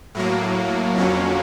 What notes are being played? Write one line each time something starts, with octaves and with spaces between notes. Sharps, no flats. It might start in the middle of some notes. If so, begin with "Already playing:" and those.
A2 F#3 A#3
F2 D3 F#3 A#3 C#4